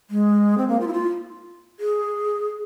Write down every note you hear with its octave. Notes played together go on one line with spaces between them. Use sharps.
G#3
C4
A#3
F4
E4
F4
G#4